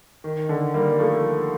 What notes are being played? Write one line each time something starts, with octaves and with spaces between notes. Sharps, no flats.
D#3
D3
G3 A#3
F3 A3